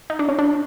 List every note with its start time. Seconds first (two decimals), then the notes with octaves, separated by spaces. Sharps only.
0.10 D#4
0.19 D4
0.29 C#4
0.39 D4